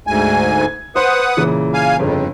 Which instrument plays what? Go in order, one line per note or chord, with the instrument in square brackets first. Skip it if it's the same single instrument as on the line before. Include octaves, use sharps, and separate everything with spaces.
[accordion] D2 G#2 G#5
[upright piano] G#6
[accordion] B4 F#5 D#6 [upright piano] C5
[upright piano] A#2 C#3 E3
[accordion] F5 G#5
[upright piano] G1 C#3 [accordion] F2